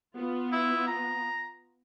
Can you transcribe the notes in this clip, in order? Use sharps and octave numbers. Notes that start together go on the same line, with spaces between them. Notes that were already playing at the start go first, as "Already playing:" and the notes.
B3 F4
E4
A#5